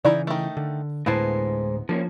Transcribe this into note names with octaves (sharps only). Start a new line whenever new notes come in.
C#3 E3 D#4 E4 D5
D#3 A3
D3
D2 A2 G#3 B3 E4 C5 A5
D3 F3 A#3 C#4